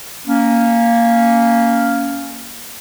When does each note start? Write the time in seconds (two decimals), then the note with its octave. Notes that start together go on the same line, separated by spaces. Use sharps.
0.26 A#3 C#4